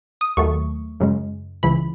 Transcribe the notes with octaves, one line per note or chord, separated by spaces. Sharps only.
D#6
D#2 D#3 F#3 A3 C#6
F#2 C#3 G#3
C#2 C#3 E3 B5